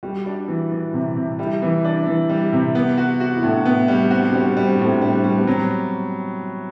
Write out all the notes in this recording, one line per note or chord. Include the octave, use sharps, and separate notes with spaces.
G3 F#4
D4
E3
E3
C3
C3
G3 E4
E3
D4
E3
G3
C3
B3
F#4
F#4
E4
A2 D4
B3
G3
C4 F#4
D4
C4
G3 D4
C4
G3 D4
C4
D4
A2 C4
D4
G3 C4
D4
G3 C4
B3
F#3 C4